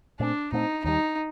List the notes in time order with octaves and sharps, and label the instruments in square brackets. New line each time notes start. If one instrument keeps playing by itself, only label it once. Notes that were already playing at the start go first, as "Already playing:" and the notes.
[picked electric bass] A#2 A3 C4 [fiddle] D4
[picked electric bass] A#2 A3 C4 [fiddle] D#4
[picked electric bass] D#2 D#3 G3 [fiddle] D#4